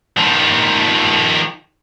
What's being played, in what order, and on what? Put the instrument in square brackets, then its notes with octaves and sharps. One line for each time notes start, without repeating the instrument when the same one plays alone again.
[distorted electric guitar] D#3 F3